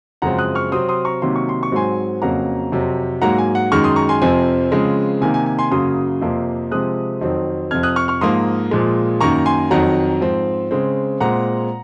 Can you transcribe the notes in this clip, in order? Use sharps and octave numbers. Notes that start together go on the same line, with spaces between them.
F#2 C#3 F3 G#3 C4 F#5 A#5
D#6 F#6
C#6 F6
C3 F#3 C4 C6 D#6
C6 D#6
A#5 C#6
C3 D#3 F#3 A#3 C6
C#6
C6
C#6
G#2 F#3 C4 G#5 C6
F2 C#3 F#3 A#3 F#5 A#5
F2 C3 F#3
G#2 F#3 A#3 F#5 A#5
G#5
F#5
F#2 D#3 G#3 C#6 F6
C6 D#6
A#5 C#6
G#5 C6
F2 C3 F3 C4 G#5
C#3 F3 G#3 C4
C3 D#3 A#3 G#5
G#5
G#5
G#5 C6
F#2 C#3 F#3 A#3 C6 D#6
F2 C3 F3 A#3
C3 F3 G#3 C4 D#6 F#6
F2 D#3 F#3 C4
F2 C3 F3 F6 G#6
D#6 F#6
C#6 F6
C#6 F6
G#2 F3 A#3 C6 D#6
A#2 F3 G#3
F#2 D#3 A#3 A#5 C#6
G#5 C6
F2 D#3 F#3 F#5 A#5
G#2 F3 C4
C#3 G#3 C4
A#2 G#3 C4 F#5 A#5